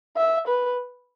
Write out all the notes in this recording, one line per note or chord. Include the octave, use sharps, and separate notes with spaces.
E5
B4